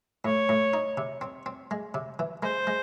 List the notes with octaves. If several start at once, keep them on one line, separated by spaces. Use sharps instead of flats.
A2 C#5
A2
D#4
C3
C4
C4
G#3
C3
E3
G#3 C5
G#3